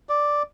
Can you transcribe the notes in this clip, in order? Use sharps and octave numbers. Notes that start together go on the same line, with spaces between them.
D5